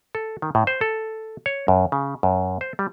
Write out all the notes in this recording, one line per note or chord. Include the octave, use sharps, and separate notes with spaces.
A4
D#3
A2
C5
A4
C#5
F#2
C#3
F#2
C5
G3